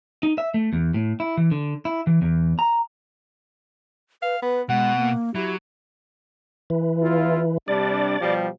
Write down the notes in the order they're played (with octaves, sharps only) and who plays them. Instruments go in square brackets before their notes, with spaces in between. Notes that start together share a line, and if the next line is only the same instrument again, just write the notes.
[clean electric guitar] D#4
E5
A3
E2
A2
E4
E3
D3
E4
E3
E2
A#5
[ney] B4 [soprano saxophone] F5
[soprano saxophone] B3 [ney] B4
[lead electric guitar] B2 [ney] G#3 [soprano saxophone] F#5
[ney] A#3
[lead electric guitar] F#3 [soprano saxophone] E4 [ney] G4
[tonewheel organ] E3
[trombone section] E2 E4 F4
[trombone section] C3 G3 D4 [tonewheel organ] D5
[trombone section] B2 F3 G3